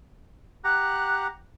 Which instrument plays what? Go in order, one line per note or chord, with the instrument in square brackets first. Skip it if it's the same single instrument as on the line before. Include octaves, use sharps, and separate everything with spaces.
[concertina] G4 F#5 A#5 [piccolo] F#6